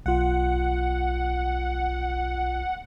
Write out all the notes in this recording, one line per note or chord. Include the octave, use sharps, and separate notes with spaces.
B1 F4 F#5